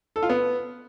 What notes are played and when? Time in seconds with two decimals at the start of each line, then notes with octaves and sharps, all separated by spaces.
0.16 A4
0.23 F4
0.29 B3